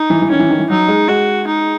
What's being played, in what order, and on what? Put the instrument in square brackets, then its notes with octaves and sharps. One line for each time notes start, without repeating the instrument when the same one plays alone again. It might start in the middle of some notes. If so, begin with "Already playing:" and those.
Already playing: [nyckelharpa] D#4
[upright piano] E3
E3
[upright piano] D#3 [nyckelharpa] C#4
[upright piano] E3
D#3
E3
[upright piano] F#3 [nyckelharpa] D#4
[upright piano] G#3
[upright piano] G#3 [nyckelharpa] F#4
[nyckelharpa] D#4